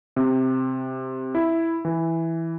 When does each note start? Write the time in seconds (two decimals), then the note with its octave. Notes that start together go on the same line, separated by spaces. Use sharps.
0.16 C3
1.35 E4
1.85 E3